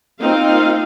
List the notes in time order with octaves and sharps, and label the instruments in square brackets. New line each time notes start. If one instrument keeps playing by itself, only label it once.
[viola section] A#3 C4 D#4 F4 F5